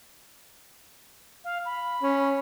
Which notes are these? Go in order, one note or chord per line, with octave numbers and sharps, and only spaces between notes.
F5
B5
C#4